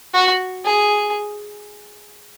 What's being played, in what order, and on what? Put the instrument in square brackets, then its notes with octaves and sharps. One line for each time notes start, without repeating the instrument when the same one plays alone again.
[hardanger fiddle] F#4
G#4